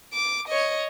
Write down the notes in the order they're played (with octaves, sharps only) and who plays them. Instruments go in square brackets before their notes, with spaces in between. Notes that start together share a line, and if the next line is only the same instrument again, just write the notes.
[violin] D6
C#5 D#5